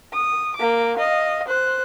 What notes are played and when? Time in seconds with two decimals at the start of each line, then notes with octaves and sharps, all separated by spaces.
0.13 D#6
0.56 A#3 D6
0.97 D#5 F5
1.48 C5 F#6